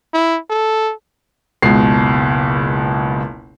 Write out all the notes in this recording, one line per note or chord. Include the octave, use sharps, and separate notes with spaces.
E4
A4
F#1 C#2 B2 C7